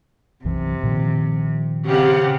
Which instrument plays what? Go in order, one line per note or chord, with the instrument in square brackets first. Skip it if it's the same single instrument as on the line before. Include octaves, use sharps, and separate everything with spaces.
[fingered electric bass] B1 F#2 E3 [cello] C3
[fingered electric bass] A#2 D#3 F3
[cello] C#3 C4 [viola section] G4 F5 F#5